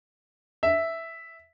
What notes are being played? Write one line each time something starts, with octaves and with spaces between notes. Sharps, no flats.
E5